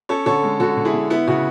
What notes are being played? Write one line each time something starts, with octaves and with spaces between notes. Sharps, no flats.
C#4 A4 C#5
D3 A4 C#5
G#3
D3 F#4 A4
D3
E4 G#4
D3
B3 E4
C#3 F#4